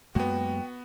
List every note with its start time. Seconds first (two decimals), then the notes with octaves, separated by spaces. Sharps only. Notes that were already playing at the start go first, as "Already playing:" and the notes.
0.15 F#2 G#3 A#3 B3 F#4 G5